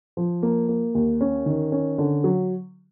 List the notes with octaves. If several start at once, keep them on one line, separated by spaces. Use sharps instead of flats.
F3
A#3
A#3
D#2
C#4
D#3
C#4
D3
F#3